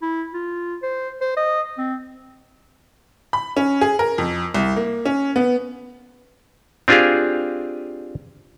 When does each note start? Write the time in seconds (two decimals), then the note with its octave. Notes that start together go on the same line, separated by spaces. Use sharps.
0.02 E4
0.34 F4
0.83 C5
1.21 C5
1.37 D#5
1.78 C4
3.33 B5
3.57 C#4
3.81 G#4
3.99 A#4
4.18 F2
4.54 C2
4.76 A#3
5.05 C#4
5.36 B3
6.88 C4 D4 F4 G4 G#4 F5